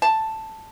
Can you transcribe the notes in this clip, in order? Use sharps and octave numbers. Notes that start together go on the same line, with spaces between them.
A5